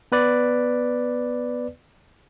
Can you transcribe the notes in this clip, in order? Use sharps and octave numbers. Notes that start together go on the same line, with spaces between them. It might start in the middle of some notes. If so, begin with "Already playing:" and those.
B3 B4 D5